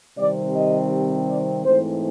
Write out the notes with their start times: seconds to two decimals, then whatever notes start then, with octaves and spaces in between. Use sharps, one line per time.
0.18 C3 D#3 G3 C4 D5
0.55 D#5
1.28 D5
1.65 G#2 E3 A3 C4 C5